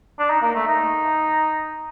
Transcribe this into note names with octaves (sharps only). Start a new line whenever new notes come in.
D4
D#4
A#3
A3
D#4